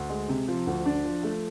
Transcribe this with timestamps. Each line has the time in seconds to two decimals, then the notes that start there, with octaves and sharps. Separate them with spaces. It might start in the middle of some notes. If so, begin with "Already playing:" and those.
Already playing: D2
0.10 G#3
0.29 C3
0.48 F3
0.67 D2
0.85 D4
1.04 F3
1.23 A3